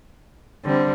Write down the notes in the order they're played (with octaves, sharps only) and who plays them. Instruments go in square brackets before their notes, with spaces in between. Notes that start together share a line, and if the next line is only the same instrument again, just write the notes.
[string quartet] D3 G3 C4